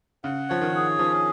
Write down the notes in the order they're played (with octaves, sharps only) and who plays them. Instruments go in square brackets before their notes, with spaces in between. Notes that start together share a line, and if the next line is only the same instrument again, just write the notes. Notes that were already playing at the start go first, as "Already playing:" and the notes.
[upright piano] C#3 [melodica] F#5
[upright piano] F3 [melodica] C#5
[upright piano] D#3
[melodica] G#4
[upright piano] F3 [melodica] C#4